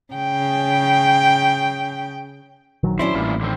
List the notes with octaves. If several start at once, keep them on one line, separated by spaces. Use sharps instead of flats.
C#3 G5
A#1 D#3 F#3
F#3 C#4 D4 E4 C5
A1 G2 A#2 F4
D3 D#3 C4